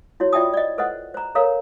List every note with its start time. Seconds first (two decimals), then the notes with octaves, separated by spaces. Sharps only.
0.20 E4 F#4 C#5
0.33 F4 D5 E5 G5 A5 D#6
0.54 D5 D#5
0.78 A4 B4 C5 D#5 F#5
1.14 C5 A#5
1.35 A4 A#4 C#5 F5 A#5